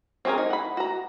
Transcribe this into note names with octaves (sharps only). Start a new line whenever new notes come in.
C4 C#4 F#4 G#4 A#4
D#4
F#5 B5
F#4 A#5